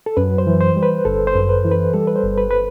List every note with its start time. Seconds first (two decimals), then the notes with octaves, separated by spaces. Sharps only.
0.06 A4
0.17 F#2 B4
0.38 C5
0.47 E3
0.61 C5
0.76 G3
0.83 B4
1.05 G1 A4
1.27 C5
1.34 F#2
1.49 B4
1.64 E3
1.71 B4
1.94 G3 A4
2.07 B4
2.16 C5
2.23 G1
2.38 B4
2.51 B4